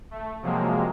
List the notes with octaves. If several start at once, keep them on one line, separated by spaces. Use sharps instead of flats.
A3
C3 F3 F#3 G#3 A#3